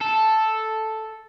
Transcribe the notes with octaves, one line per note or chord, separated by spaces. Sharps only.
A4